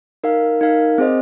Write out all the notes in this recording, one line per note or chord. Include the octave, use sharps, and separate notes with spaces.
D#4 A#4 F5
D#4 A#4 F5
C4 G#4 C5 D#5